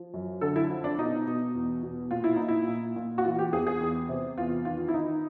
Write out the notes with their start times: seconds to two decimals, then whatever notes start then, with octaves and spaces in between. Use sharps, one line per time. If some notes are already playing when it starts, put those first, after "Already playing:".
Already playing: F3
0.14 F#2
0.41 D3 A4
0.56 E4
0.70 F3
0.84 D4
0.98 B2 D#4
1.27 B2
1.55 E2
1.83 B2
2.11 A#2 F4
2.24 E4
2.36 A#2 D#4
2.48 E4
2.68 A#2
2.96 A#2
3.18 F#4
3.24 E3 F4
3.39 G4
3.52 E2 G#4
3.67 G#4
3.81 E2
4.09 C3
4.38 E2 F4
4.65 D#3 F4
4.88 E4
4.94 D#3 D#4